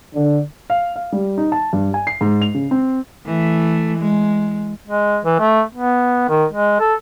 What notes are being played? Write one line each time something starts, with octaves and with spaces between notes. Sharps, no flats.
D3
F5
F5
G3
D#4
A5
G2
G#5
C7
G#2
F7
C#3
C4
E3 A3
G#3
G#3
E3
A3
B3
D#3
G#3
A4